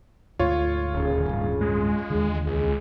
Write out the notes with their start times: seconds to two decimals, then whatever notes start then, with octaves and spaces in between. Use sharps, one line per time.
0.39 D2 G#2 A3 F4 C#5
0.94 D#1 C#3
1.29 D1 G2 C#4
1.61 G#3
2.10 D#2 D3
2.47 C#2 G#3 G#4